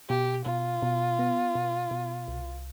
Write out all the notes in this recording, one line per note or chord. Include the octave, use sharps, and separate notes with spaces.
B2 G4
B2 F4
B2
B3
B2
B2
C2